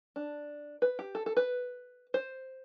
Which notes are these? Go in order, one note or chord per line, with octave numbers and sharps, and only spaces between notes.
D4
B4
G4
A4
A4
B4
C5